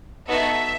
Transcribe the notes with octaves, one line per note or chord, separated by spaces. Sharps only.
B3 D#4 F#4 A4 E5